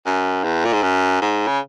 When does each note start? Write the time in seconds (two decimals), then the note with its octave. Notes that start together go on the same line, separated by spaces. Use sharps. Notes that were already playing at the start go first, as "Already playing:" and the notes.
0.06 F#2
0.44 E2
0.65 A#2
0.73 G#2
0.83 F#2
1.21 G#2
1.47 C#3